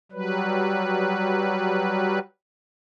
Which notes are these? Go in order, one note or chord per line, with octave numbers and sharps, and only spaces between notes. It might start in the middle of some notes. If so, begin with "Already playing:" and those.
F#3 G3 B4